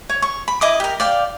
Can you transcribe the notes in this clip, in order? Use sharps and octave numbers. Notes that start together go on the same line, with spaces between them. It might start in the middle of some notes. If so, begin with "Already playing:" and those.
C#5
C#6
B5
E4 D#5 D6 D#6
G4 A#4
D5 F5 G5